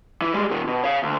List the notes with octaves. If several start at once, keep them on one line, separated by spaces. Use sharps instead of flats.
E3
G3 G#3
A#2 D#3
B2
C#5 F5
D2